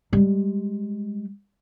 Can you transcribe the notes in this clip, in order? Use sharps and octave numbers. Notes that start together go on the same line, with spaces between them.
G3 G#3